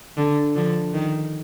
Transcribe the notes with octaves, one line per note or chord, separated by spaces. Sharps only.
D3
D3 F3
D#3